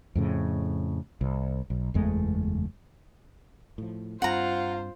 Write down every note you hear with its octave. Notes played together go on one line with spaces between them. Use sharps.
F2 A2 C#3
C2
B1
F#1 E2 G#3 A3
A2 F3
G2 C4 F4 C5 F#5 A#5